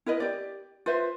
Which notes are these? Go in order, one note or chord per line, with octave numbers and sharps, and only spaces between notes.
E4 A#4 B4 D#5
G4 D5
F4 B4 C5 E5